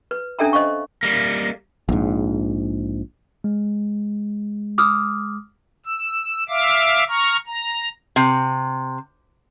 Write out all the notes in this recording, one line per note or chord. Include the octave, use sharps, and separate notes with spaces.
B4
C#4 D4 A4 E5 G5 A#5
C5 D#5 F5 C#6
G3 A#3
A#1 G#2
G#3
D6 D#6 F6
E6
E5 F5 D6
A#5 C#6 F6
A#5
C3